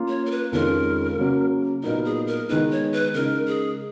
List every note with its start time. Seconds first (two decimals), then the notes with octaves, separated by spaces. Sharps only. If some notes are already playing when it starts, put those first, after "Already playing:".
Already playing: A#3 C#4 F4
0.09 C#5
0.26 A#4
0.31 B4
0.52 F2 D#3 G#3 C#4 F4 A#4
1.18 C#3 F#3 A#3 C#4 F#4
1.83 A#2 F#3 B3 D#4 A#4
2.05 G#4
2.27 A#4
2.49 D#3 G#3 B3 D#4 B4
2.71 C#5
2.93 B4
3.14 C#3 G#3 D#4 A#4
3.48 G#4